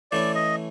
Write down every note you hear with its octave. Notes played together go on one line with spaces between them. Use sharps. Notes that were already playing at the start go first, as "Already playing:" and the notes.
E3 A3 C#4 E4 D5
D#5